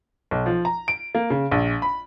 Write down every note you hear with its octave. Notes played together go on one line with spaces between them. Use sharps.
B1
F3
A#5
D7
A#3
C#3
A#1
B5